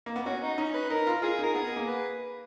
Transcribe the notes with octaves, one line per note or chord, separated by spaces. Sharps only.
A#3
B3
C#4 F#4
D#4
C#4 D#4
B4
D#4 A#4
F4
F4 G#4
D#4 A#4
B3 G#4
A#3
B4